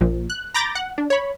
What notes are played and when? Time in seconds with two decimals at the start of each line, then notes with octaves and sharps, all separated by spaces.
0.01 A#1 A#2 F3
0.30 F#6
0.54 A#5 B5 D6 G6 A6 A#6
0.75 F#5
0.98 D4
1.10 C#5 B5